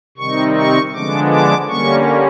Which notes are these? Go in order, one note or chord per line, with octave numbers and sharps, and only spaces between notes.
C3 D#3 G3 C4 D#4 C#6
C#6
D3 F3 G#3 B3 D4 D6
D6
D3 G3 A#3 C#4 C#6